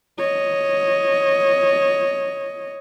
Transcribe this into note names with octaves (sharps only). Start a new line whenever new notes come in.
C#5 D#5